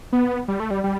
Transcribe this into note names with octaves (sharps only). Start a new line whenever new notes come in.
B3
G3
A3
G3
G3